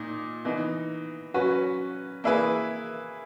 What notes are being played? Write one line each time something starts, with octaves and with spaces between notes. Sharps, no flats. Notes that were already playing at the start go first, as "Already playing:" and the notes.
Already playing: A#2 D#4
E3 B3 D#4
F#3 C#4 F#4 B4
A#3 E4 G#4 B4